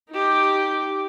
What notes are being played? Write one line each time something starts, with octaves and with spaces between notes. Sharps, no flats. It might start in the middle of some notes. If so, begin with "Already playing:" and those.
D#4 G4